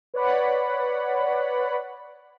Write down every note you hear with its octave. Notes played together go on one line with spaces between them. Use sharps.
B4 C#5 D5 F#5 B5